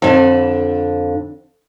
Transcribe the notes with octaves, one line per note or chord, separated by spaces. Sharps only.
F2 D3